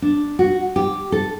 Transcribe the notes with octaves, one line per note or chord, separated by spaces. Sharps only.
D4
F#4
G4
A4